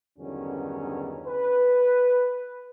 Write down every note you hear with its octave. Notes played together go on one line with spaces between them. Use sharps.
E2 G2 D3 D#3 F#3 C#4
B4